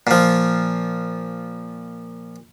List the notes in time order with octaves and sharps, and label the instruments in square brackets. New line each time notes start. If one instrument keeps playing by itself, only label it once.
[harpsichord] A#2 F3